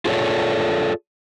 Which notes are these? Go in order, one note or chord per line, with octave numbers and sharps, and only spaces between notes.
F4 G#4 A4 B4 C#5 D5